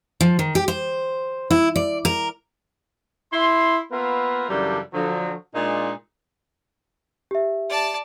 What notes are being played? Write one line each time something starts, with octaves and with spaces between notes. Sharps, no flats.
F3
D#3
G4
C5
E4
D5
A#4
E4 C6
A#3 B3 F4 A#4 B4 E5
F#2 C#3 E3 G3 D4 A4
D3 F3 F#3
A#2 G#3 D4 D#4 F4 G#4
G4 E5
D5 A5